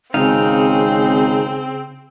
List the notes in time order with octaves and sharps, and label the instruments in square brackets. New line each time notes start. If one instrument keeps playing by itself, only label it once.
[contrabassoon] G#1 [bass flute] C#3 [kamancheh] C4 [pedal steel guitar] D#4 F5